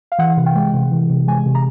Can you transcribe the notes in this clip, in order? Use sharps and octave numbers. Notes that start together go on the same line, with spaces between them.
F5
E3 F#5
C3
G5
G#3
C3
E3
C3
G#3 G#5
C3
A#5